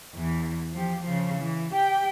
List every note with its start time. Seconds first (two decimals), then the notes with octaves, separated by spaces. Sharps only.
0.15 E2 E3
0.73 F3 G4
1.03 C#3 F3
1.39 E3
1.72 G4 G5